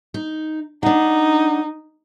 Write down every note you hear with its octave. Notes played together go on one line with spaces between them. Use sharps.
D#4
D4 D#4 F#5